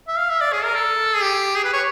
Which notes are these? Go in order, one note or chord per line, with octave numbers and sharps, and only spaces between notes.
E5
F5
E5
D5
G#4
A#4
A4
G#4
G4
G#4
B4
C#5